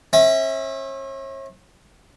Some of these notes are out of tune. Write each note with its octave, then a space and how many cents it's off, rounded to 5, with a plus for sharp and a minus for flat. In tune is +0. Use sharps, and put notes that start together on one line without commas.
C#4 -40 E5 -20